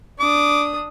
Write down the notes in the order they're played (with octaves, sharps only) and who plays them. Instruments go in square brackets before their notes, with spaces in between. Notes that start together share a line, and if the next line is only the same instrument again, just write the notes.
[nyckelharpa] D4 D#6 [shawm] D6